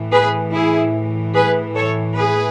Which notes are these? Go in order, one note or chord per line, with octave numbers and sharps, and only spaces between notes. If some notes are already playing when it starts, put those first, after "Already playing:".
Already playing: A2 E3
G#4 B4
E4 G#4
G#4 B4
A4 C#5
G#4 B4